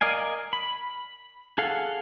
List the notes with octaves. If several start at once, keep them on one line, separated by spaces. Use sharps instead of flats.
A#4 D5 D#5 F5 G#5
B5
G#4 A4 F5 F#5